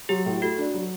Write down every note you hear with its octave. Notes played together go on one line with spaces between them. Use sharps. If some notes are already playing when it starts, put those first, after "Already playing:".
F#3 G4
A2
A3 F#4
D4
F#3